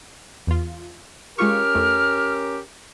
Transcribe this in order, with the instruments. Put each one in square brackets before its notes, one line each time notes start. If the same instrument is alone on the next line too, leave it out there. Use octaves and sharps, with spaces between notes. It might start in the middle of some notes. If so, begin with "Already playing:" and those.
[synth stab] E2 F4
[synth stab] G#3 F4 C#6 [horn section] C#4 G4 A#4 [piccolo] F6
[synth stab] F2 A3